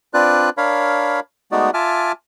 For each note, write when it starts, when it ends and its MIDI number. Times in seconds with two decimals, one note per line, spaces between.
0.14 0.50 60
0.14 0.50 62
0.14 0.50 65
0.14 0.50 71
0.14 0.50 74
0.14 0.50 90
0.57 1.20 62
0.57 1.20 70
0.57 1.20 73
0.57 1.20 77
0.57 1.20 83
1.52 1.70 56
1.52 1.70 57
1.52 1.70 59
1.52 1.70 63
1.52 1.70 66
1.52 1.70 74
1.74 2.12 65
1.74 2.12 76
1.74 2.12 80
1.74 2.12 81
1.74 2.12 86
1.74 2.12 89